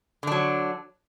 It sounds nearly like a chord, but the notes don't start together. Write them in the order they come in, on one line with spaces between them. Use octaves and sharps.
D3 D4 F#3